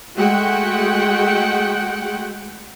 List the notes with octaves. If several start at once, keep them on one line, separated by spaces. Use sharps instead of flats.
G#3 A3 F#4 F#5 G5